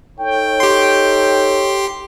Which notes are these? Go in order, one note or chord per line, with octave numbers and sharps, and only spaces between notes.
D#4 A4 C#5 G5
G4 C6